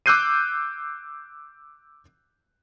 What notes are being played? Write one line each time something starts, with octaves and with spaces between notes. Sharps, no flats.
D6 E6 F#6 G6 C7 D#7